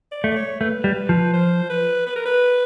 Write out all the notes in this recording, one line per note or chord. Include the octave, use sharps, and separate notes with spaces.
D5
A3
D5
C#5
A3 B4
G3
F3
C5
B4
B4
A#4
B4